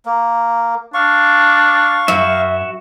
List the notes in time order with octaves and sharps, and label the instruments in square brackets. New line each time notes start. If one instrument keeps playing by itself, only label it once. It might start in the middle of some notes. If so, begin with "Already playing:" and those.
[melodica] A#3
[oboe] D4 [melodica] F5 C#6
[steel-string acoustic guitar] F#2 [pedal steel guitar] F#4 E5